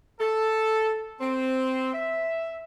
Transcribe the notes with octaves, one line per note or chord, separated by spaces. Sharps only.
A4
C4
E5